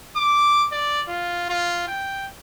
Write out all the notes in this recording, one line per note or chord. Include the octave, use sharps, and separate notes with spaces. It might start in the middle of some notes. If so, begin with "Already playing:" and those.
D6
D5
F4
F4
G5